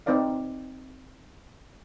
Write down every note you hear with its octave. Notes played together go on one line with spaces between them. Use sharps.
C4 D#4 B4 D5 F5